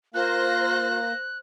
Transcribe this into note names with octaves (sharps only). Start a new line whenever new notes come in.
A#3 F4 C5 F#6 A#6